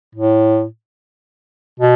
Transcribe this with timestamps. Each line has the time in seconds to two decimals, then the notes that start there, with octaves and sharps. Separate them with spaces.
0.15 A2
1.80 B2